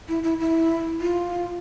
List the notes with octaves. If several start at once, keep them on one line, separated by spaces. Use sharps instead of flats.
E4
E4
E4
F4